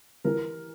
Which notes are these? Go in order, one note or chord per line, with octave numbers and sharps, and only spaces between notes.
E3 A#4